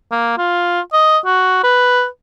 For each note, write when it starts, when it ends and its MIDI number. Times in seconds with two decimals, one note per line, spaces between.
0.11 0.35 58
0.38 0.81 65
0.93 1.18 75
1.25 1.61 66
1.64 2.06 71